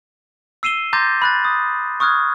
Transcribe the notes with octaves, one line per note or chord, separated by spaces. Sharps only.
E6 C7 D#7 E7 G7
A#5 C6 D6 G6 A6 A#6
B5 F#6 A6
D#6
C#6 D#6 F6 F#6 G#6